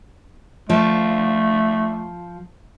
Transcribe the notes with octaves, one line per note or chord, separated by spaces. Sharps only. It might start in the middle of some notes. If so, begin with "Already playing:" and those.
F3 A3